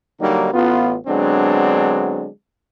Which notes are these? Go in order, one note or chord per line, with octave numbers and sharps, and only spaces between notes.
D3 F#3 G3 A#3 D#4
A1 B3 F4
D3 F#3 G#3 B3 C4 D4